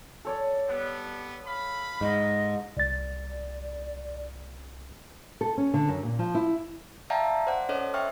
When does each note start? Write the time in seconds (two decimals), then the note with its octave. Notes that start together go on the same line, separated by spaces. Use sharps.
0.25 A4 C#5 D5
0.68 G3 B3
1.46 F5 B5
2.01 G#2 D#5
2.77 C2 D5 A6
5.41 A4
5.58 C#4
5.74 D3
5.88 F#2
6.03 A#2
6.19 F3
6.35 E4
7.10 D5 E5 F5 G5 A5 A#5
7.47 C5 D5 F#5
7.69 C#4 A4 C5 C#5 D#5
7.94 E5 G5 C#6 F6